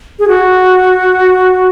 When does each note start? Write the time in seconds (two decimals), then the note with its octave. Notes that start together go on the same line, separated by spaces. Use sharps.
0.19 G#4
0.28 F#4